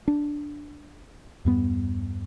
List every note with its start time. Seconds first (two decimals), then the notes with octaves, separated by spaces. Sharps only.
0.08 D4
1.45 E2 G2 B3